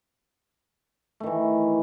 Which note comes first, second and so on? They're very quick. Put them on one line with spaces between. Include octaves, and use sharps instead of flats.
A3 D#3 E3